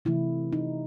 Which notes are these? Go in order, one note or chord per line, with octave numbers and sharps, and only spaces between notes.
C3 E3 A3 E4
D#4